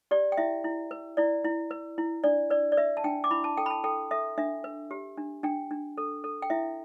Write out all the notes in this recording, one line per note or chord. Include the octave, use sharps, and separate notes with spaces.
G4 D5
G5
E4 E5
E4
B4
E4 D5
E4
B4
E4
D4 D5
B4 D5
D5
B4 E5
A5
D4 G5
D6
E4 B5
A5
A4 G5
B5
A5
A4 G5
A4 E5
D4 E5
B4
G4
D4
D4 G5
D4
A4
A4
G5
E4 E5